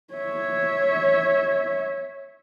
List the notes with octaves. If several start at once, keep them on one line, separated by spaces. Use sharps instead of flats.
C#5 E5